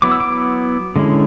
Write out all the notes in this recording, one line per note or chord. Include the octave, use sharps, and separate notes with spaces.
F#3 B3 E4 D6
E6
D6
D3 G#3 C#4 E4